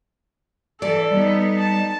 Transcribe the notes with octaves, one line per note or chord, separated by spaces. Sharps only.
E3 A4 D5
G3 B3 D#4
A5